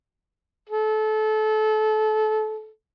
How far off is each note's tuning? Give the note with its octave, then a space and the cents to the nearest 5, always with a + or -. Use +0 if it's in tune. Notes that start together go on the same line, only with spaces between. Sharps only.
A4 -25